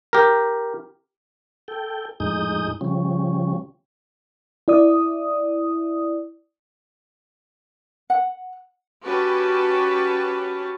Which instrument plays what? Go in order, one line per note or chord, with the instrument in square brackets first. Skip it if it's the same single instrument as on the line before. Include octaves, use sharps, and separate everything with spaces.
[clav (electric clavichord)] G4 A#4
[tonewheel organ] A4 G5
F2 A2 G#3 D#4 D#6 G6
C#3 F3 G3 C#4
[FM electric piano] E4 D5 D#6
[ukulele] F#5
[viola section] C#4 F#4 G4 B4 A5